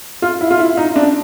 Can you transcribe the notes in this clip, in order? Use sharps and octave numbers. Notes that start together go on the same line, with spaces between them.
F4
E4
F4
E4
D#4
D4